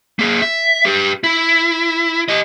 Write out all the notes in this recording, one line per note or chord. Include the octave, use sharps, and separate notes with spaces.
A#3 G#4
E5
G4 B4
E4
G4 D#5